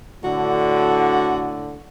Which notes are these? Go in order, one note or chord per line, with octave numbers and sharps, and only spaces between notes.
A2 D3 F#4